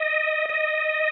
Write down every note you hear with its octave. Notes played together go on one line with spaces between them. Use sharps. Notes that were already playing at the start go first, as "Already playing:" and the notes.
Already playing: D#5
D#5